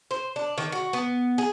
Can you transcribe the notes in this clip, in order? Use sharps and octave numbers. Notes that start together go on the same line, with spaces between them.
C5
D4
D#3
F#4
B3
G#4